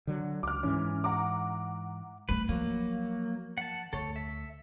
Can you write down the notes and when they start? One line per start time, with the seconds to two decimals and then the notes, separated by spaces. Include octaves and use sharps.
0.07 D3 F#3
0.43 C#2 D6 F6
0.63 G#2 E3 C#4
1.04 F#5 A#5 D6
2.29 G3 A3 B4
2.49 F3 F#3 A#3
3.58 F#5 A5
3.93 D2 A4 C#5
4.16 E5